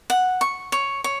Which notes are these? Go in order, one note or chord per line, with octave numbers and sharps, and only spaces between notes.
F#5
C#6
C#5
C#5